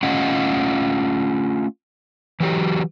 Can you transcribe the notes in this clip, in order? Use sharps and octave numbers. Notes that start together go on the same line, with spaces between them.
A3 C#4 F4 D#5 F#5
E3 F#3 G4